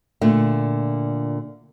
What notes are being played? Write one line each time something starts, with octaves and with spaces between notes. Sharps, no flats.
A#2 D3 A3